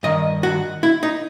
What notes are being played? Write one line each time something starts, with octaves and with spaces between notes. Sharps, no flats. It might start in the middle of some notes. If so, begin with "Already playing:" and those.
G2 D#3 D#5
F#4
E4
D#4